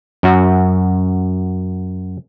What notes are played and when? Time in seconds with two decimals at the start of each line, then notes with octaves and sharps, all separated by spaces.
0.23 F#2 F#4